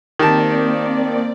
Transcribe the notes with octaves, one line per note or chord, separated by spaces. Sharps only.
D#3 A#3 C4 G4 D5 A5